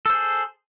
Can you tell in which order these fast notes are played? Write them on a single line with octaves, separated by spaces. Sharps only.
A4 C5 G#4